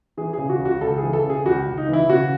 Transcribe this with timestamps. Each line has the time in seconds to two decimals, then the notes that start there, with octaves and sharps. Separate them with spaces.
0.17 E3 G#4
0.33 C#3 G#4
0.49 F#4
0.60 C#2
0.65 F#4
0.81 C#2 A4
0.98 G#4
1.03 E3
1.13 A4
1.24 C#3
1.30 G#4
1.46 C#2 F#4
1.66 C#2
1.77 D#4
1.88 E3 E4
2.09 C#3 F#4